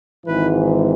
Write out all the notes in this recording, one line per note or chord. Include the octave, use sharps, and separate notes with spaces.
G#1 G#2 E3 B4